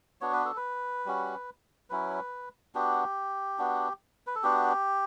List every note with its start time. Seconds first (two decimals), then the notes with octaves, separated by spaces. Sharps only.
0.21 B3 D4 F#4 C#5
0.33 B4
0.45 A4
0.57 B4
1.06 G3 C#4 F#4
1.90 F#3 C#4 E4 B4
2.75 B3 D4 F#4 G4
3.59 B3 D4 F#4
4.27 B4
4.36 A4
4.43 B3 D4 F#4 G4